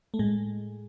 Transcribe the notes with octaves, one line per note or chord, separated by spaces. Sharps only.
A3
A2 G#3